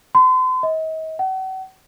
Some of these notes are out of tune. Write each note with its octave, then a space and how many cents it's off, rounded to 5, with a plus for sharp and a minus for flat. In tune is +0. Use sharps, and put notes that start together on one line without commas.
C6 -40
D#5 +40
F#5 +40